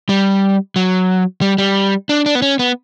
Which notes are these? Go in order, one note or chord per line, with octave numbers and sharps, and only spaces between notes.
G3
F#3
G3
G3
D4
D4
B3
C#4
B3